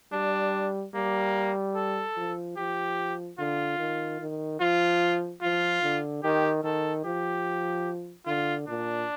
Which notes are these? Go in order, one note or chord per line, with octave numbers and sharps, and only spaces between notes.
G3 D4
G3 A#3
A4
F3
F3 G4
D3 F4
D#3
D#3
F3 F4
F3 F4
D3
D#3 G4
D#3 A4
F3 G4
D3 F4
A#2 D4